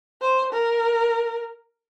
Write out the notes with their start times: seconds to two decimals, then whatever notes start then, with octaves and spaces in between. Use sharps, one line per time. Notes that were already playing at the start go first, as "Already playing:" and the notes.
0.22 C5
0.53 A#4